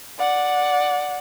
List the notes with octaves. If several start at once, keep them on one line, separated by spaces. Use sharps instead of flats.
D5 F#5